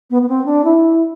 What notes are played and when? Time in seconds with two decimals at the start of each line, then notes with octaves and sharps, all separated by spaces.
0.11 B3
0.22 B3
0.29 C4
0.46 D4
0.65 E4